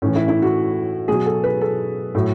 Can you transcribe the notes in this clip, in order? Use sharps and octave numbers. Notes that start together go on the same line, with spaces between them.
A2 E3 C#4
E4
E4
F#4
B2 F#3 G#4
A4
B4
A4
A2 F#3